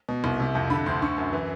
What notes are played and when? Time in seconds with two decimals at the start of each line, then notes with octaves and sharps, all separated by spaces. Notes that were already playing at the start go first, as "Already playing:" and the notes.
0.09 B2
0.24 C2
0.40 C3
0.55 F2
0.70 D3 B5
0.86 D2 C6
1.02 D3 C#6
1.18 F#2
1.33 E3